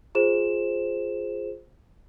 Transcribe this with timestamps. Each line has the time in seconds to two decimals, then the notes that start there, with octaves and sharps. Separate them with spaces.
0.15 F4 G#4 C5 E7